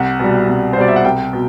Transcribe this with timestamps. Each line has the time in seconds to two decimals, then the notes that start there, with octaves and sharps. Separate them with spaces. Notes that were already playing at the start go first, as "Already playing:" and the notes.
Already playing: C2 F#5
0.20 B2 G3
0.48 C2
0.73 C5
0.76 B2 G3 D5
0.88 E5
0.96 F#5
1.05 C2 G5
1.33 B2